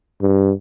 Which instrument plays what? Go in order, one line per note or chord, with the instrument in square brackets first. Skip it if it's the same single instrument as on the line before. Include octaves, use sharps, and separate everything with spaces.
[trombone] G2